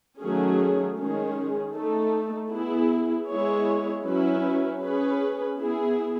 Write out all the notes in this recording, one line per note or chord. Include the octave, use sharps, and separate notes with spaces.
D#3 F#3 A3 C#4 G#4
D#3 G#3 C#4 G#4
A3 D#4 A4
B3 E4 G#4
G#3 B3 E4 G#4 C#5
F#3 C#4 E4 B4
C#4 G#4 B4
B3 E4 G#4